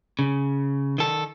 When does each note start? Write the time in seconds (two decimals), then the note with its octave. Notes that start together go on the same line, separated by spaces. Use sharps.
0.19 C#3
0.98 D#3 A4